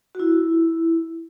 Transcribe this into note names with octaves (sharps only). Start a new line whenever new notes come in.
F#4
E4